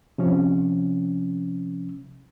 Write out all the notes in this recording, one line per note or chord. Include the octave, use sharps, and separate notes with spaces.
C3 F3 C#4